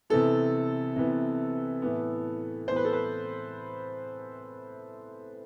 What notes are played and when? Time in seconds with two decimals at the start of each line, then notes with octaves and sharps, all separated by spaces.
0.10 C3 E3 B3 A4
0.96 C3 E3 B3
1.82 A2 E3 B3
2.68 A2 E3 B3 C5
2.76 B4
2.85 A4
2.93 B4